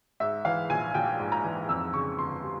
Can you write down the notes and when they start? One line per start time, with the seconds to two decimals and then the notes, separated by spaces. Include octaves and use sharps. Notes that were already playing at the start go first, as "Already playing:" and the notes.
0.20 G#2 E5
0.45 E3 F5
0.70 A#1 G#5
0.94 A#1 G5
1.20 G#2
1.32 A#5
1.44 E3
1.69 F2 E6
1.94 C#3 C#6
2.18 G1 C6
2.44 G3